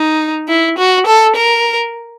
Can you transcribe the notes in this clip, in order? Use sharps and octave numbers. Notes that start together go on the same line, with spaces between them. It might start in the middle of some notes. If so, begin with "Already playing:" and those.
Already playing: D#4
E4
F#4
A4
A#4